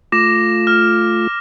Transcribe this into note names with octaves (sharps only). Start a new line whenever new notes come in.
A3 F4 D6 A#6 E7
F6